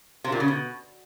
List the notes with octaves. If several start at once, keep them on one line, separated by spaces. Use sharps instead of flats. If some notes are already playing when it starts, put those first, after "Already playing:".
C3
A#2
C#3
B2